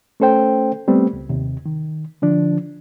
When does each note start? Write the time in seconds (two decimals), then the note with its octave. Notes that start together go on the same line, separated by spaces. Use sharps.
0.20 A3 C#4 A4 C5 G5
0.88 G3 A3 B3 C4
1.13 C#2
1.29 D#2 C3
1.66 D#3
2.22 D3 F3 D4